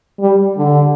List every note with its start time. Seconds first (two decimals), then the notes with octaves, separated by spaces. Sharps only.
0.19 G3
0.57 D3